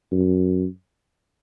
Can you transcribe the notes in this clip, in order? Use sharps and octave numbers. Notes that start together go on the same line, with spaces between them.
F#2